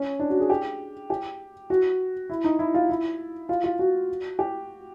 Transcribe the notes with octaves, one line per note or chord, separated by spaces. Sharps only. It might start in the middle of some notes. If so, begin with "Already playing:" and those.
Already playing: C#4
D4
F#4
G#4
G4
G4
F#4
E4
D#4
E4
F4
E4
F4
F4
F#4
G4